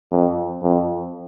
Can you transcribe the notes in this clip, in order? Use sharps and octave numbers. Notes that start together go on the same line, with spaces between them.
F2
F2